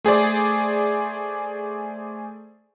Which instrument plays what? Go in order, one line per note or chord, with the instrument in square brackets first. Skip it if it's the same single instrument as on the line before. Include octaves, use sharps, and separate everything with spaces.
[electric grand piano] A3 G#4 C5 D5